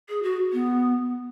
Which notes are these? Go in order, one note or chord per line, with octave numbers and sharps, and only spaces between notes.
G#4
F#4
B3